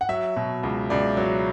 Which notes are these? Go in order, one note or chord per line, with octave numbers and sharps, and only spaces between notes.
F#5
F#3 E5
B2
C#2
C#2 D5
F#3